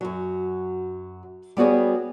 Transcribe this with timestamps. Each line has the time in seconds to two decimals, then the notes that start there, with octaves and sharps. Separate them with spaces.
0.01 F#2 F#3
1.57 G3 B3 F#4 G#4 C#5